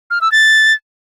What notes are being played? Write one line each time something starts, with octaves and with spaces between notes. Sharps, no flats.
F6
E6
A6